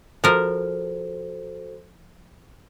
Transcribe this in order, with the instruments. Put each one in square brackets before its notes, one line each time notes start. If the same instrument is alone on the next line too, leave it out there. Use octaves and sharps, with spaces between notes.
[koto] F3 A#4 [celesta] F#4 A4 C5